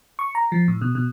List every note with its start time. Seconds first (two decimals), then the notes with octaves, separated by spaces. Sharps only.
0.19 C#6
0.35 A#5
0.52 F3
0.68 A2
0.81 B2
0.95 B2